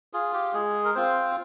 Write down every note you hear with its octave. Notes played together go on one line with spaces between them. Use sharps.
F4 G#4
G4
G#3 G#4
A#4
C4 F4 C5